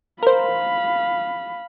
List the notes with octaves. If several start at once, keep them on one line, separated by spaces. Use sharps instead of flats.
A#4 C5 F5 B5